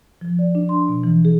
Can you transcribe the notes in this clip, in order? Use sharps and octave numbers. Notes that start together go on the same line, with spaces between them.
F3
D5
D4
C6
B2
E3
G#4